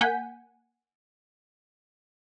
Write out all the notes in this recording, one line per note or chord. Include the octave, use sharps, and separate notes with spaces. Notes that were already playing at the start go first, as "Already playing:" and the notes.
A#3 F#5 G#5 G6 B6